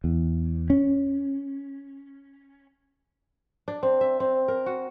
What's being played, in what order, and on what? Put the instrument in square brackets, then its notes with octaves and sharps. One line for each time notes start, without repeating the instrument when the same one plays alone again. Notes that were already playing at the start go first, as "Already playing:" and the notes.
[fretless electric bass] E2
C#4
[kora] D4
C4
E5
C4
A#4
F#4